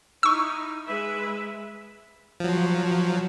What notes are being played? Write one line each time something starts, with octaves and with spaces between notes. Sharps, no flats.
D#4 E4 C#6 E6
G#3 B4 E5
F3 F#3